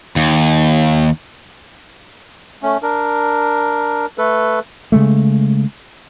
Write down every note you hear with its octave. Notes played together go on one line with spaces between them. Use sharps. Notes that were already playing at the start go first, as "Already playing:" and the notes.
D#2
A3 C#4
D4 A#4
A3 A4 B4
C#3 G#3 A3